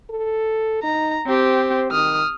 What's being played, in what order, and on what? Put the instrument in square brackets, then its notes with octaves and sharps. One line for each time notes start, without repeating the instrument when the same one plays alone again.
[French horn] A4
[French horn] D#4 [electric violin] A#5
[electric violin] C4 G4 [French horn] C5
[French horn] D#3 [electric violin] D#6 F6